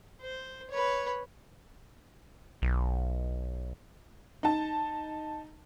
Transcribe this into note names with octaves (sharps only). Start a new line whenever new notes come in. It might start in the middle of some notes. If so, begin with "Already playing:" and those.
C5
B4 C#5
B1
D#4 A5